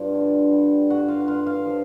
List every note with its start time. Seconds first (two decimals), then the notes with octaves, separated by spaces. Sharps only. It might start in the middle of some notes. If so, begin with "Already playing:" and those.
Already playing: G2 G3 F4
0.15 D3
0.52 G3
0.90 G2 F#4 F#5
1.08 F4 F5
1.20 F#5
1.28 G2 F4 F5
1.46 F4 F5
1.65 F3